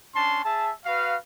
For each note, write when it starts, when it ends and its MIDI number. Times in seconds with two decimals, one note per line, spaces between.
0.16 0.39 61
0.16 0.39 62
0.16 0.39 81
0.16 0.39 84
0.45 0.70 68
0.45 0.70 76
0.45 0.70 81
0.85 1.16 66
0.85 1.16 71
0.85 1.16 77